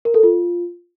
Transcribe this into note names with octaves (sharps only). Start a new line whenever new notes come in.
A#4
A4
F4